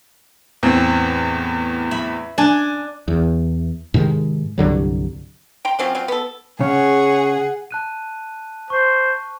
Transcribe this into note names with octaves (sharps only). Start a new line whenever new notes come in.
E2 A2 C4
E5 B5
D4 G#5
E2
G#2 C3 D#3 G#3
C2 G2 D3 F#3
G5 A#5 C6
F3 F#3 C4 C#4
F#3 C4 F4
B3 A4
C#3 G#4 C#5 F#5
A5 F#6 D#7
C5 C#6